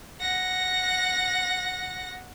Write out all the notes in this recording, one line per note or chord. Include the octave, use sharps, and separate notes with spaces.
F#5 A#6